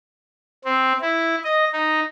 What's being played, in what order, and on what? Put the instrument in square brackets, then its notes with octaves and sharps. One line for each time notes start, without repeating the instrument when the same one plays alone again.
[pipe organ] C4
E4
D#5
D#4